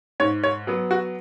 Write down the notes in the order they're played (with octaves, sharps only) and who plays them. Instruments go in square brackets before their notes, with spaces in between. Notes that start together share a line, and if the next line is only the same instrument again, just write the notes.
[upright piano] G#2 C#5
C#5
F#3 B3
F#4